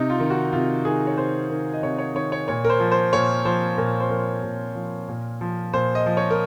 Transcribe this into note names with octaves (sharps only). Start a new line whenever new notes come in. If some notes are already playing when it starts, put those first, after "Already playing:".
Already playing: C3 D#4
F4
D#3
F#4
C3 F4
D#3 G#4
C#5
C3 C5
D#3
D#5
C3 C#5
C#5
D#3 C#5
C#5
A#2 C#5
A#4
C5
F3
C5
A#2 C#5
F3 C5
A#2 A#4
C5
F3 A#4
A#2
F3
A#2
F3
A#2 C5
D#5
F3
C#5
A#4